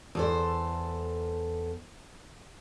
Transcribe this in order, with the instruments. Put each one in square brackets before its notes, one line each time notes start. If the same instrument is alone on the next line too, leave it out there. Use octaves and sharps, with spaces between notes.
[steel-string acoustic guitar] E2 A4 C5